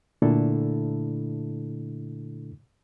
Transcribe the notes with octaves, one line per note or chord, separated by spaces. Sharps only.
A#2 D3 A3 D4 E4 A4